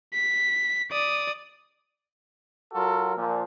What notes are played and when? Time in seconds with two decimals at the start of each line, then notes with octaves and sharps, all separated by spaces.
0.14 B6
0.92 D5 D#6
2.73 F#3 F4 F#4 A4 A#4
3.16 A#2 F3